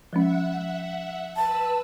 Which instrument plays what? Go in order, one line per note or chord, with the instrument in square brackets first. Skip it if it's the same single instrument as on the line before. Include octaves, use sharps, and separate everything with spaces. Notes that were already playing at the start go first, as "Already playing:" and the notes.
[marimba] F3 G#3 C#4 [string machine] E5 F#5
[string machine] B4 E6 [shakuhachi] A5